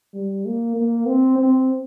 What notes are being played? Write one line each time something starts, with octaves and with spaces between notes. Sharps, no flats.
G3
A#3
A#3
C4
C4